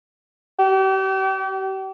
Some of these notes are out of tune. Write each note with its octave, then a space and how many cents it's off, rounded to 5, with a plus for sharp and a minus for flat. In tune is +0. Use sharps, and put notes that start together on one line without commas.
G4 -40